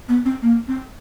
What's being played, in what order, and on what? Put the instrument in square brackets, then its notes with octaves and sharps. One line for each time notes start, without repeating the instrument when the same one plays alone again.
[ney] B3
C4
A#3
C4